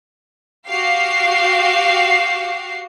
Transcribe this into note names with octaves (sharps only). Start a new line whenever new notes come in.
F#4 G4 F5 C7